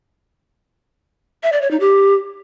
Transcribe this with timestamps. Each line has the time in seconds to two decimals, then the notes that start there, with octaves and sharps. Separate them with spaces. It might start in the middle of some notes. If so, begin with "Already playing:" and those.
1.43 E5
1.52 D5
1.62 C#5
1.71 D#4
1.80 G4